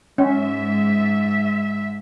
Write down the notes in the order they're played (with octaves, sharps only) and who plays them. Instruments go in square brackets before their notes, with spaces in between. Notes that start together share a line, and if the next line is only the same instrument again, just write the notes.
[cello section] G#2 E5 [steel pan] C#4